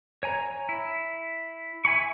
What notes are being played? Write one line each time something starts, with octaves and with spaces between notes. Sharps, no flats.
C#5 G#5 A#5
E4
E5 G#5 B5 C#6